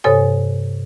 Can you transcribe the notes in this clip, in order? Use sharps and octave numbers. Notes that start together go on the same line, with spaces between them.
G2 C3 A4 C#5 G#5 D#6